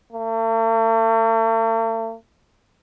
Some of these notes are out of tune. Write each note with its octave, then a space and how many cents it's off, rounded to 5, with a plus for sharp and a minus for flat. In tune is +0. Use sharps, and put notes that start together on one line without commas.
A3 +45